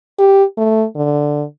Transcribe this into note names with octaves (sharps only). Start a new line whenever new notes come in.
G4
A3
D3